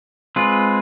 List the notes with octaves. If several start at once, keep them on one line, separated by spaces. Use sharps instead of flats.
G#3 C4 F4 G#4 B4